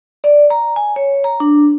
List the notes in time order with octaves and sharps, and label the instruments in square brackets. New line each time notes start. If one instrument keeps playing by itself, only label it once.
[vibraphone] D5
A#5
G#5
C#5
A#5
D4